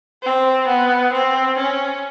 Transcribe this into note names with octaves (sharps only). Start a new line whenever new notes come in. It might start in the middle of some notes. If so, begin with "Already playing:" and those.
C4
B3
C4
C#4